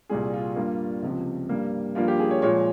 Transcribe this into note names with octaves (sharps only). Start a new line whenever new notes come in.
C2 A#2 G3 G#4
F4
G2 G3 A#3
C#2 C3 F3
G2 G3 A#3
G2 F3 A#3 F4
G4
G#4
C#5
A#2 F3 G#3 C#5